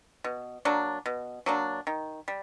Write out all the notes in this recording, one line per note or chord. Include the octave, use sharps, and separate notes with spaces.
B2
F#3 A#3 D4
B2
F#3 A#3 D4
D#3
G3